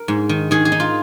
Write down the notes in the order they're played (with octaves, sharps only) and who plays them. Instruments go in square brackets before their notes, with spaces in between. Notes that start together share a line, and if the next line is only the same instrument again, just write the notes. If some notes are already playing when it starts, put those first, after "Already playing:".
Already playing: [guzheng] A#4
G#2
D#3
D#3 G#4
G#4
D#4
F4